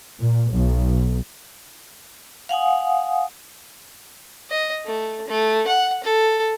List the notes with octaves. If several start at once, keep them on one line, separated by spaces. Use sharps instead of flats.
A#2
B1
F5 F#5 G#5 D#6
D#5
A3
A3
F#5
A4